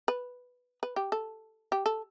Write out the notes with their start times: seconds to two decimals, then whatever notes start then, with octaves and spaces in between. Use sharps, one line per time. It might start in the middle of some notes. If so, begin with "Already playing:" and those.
0.08 B4
0.83 B4
0.96 G4
1.12 A4
1.72 G4
1.86 A4